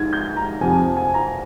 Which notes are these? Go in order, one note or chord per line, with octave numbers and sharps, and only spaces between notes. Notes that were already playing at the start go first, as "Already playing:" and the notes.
Already playing: G#2 G#6
G6
A#5
F2 C3 F3 G#5
G#5
A#5